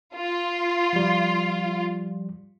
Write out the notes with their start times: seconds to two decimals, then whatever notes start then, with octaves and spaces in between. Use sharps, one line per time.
0.16 F4
0.93 F3 G3